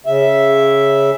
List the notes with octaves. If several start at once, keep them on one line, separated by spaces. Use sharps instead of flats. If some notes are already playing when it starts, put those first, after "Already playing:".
C#3 E5